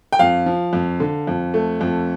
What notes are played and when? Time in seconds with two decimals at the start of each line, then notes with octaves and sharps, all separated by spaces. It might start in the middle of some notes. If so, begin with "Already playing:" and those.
0.12 G5
0.19 F2 F5
0.46 F3
0.73 F2
1.00 D3
1.27 F2
1.54 A3
1.81 F2